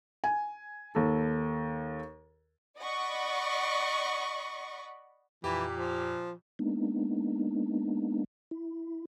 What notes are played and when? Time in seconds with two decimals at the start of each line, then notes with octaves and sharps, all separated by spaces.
0.24 G#5
0.95 D#2 A4
2.80 D5 D#5 F#5 B5 C#6
5.44 F2 A#2 E3 G4
5.73 F3
6.59 G#3 A#3 B3 D4 D#4
8.51 E4